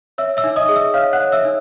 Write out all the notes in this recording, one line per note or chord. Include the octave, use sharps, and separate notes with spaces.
C#5 E5 E6
E5 E6
D#4
D#5 D#6
G#4
E5 E6
C#5 F5 F6
F#5 F#6
C#5
E5 E6
D#4